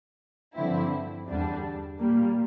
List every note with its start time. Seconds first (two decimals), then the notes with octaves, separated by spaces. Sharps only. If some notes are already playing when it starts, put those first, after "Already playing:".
0.54 G2 D3 F3 C4 E4
1.27 E2 D3 G3 D4
1.99 A#2 G3 A#3